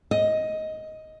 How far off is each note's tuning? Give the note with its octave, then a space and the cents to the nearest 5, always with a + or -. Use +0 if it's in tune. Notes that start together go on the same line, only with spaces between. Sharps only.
D#5 +10